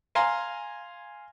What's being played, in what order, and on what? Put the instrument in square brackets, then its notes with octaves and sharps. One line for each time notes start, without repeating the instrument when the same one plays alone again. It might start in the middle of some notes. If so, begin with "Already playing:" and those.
[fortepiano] F5 G#5 A#5 C6